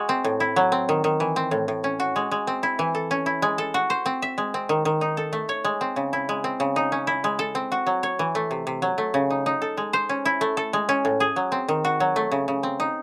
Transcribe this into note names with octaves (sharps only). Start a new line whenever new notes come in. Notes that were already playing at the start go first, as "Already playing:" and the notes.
Already playing: G#3 F#4
C4
A2
E4
F#3
C4
D#3
D#3
E3
C4
A2
A2
C#4
F#4
G#3
G#3
C4
E4
E3
A4
C#4
E4
G#3
A4
F#4
C5
C4
E5
G#3
C4
D#3
D#3
D#4
A4
A3
C#5
G#3
C4
C#3
E4
G#3
C4
C#3
D#4
C#4
E4
G#3
A4
C4
F#4
F#3
C#5
E3
A3
C3
C3
F#3
A3
C#3
D#4
D#4
A4
G#3
C5
C#4
E4
A3
A4
G#3
C#4
A2
G#4
F#3
C4
D#3
F#4
F#3
A3
C#3
C#3
C4
D#4